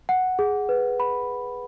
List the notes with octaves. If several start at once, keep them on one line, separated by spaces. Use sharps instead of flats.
F#5
G#4
B4
B5